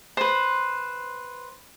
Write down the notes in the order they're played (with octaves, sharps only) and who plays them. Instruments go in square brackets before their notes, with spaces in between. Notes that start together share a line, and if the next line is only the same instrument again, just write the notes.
[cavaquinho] B4 C5